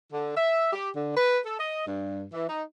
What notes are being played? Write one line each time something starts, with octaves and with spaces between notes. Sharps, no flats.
D3
E5
G4
D3
B4
A4
D#5
G2
E3
D#4